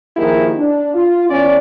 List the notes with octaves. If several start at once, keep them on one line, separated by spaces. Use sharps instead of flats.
D#3 F3 A#3 E4 G4 G#4
D4
F4
E2 C#4 D5